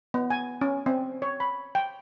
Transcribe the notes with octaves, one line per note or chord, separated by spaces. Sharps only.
B3
G#5
C#4
C4
C#5
B5
G5